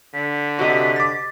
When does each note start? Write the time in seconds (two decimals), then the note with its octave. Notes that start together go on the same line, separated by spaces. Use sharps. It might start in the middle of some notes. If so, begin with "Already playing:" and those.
0.14 D3 B6
0.59 C3 F#4 G4 C5 D#5
0.96 D6 A6